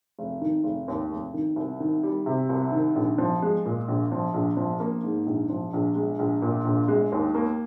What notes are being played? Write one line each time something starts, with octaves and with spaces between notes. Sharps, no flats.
F1
D#3
F1
D#2
F1
D#3
C2
D#3
G3
C3
C2
D#3
A#1
F3
G#3
A#2
A#1
F3
A#1
F3
A#3
G#2
A#1
F3
A#1
G#3
A#1
A#2
A#1
G#3
D#2
A#3